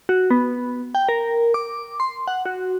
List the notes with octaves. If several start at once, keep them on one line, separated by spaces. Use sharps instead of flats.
F#4
B3
G5
A#4
D6
C6
F#5
F#4